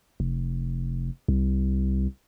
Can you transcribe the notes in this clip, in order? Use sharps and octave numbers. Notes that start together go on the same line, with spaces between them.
F1
C2